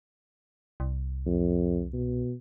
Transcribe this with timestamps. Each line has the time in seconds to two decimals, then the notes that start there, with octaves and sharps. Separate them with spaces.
0.80 C2
1.26 F2
1.93 B2